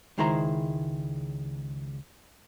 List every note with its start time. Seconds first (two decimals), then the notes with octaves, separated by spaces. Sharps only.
0.18 C#2 D#3 G#3 E4 C5 A#5